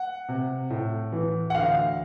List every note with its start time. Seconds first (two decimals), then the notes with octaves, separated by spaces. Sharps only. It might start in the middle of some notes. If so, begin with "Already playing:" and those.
Already playing: F#5
0.29 C3
0.70 A2
1.12 E3
1.50 F#5
1.55 D2 F5